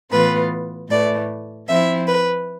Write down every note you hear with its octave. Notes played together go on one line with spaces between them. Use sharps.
A2 E3 B3 F4 B4
A2 E3 A3 D5
F3 C4 E4 E5
B4